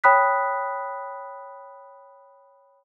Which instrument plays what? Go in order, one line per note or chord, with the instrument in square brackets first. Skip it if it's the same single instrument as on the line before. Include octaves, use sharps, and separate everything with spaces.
[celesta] C#5 G5 B5 D#6 F#6 B6